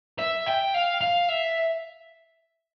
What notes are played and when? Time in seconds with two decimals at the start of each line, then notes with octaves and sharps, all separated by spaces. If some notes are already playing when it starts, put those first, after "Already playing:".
0.19 E5
0.46 G5
0.74 F5
1.01 F5
1.29 E5